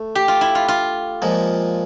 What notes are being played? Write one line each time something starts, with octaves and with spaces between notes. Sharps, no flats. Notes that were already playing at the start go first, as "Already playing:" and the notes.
Already playing: A3
G4
F4
E4
F4
F4
A#2 F3 G#3